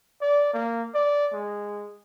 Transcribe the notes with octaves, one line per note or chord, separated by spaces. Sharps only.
D5
A#3
D5
G#3